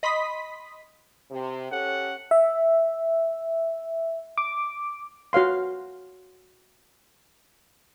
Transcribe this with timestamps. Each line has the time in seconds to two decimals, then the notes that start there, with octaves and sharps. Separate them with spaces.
0.03 D#5 B5 C6 D#6 B6
1.31 C3
1.72 C#4 G4 A4 F#5
2.31 E5
4.38 D6
5.33 F#4 C#5 F5 C6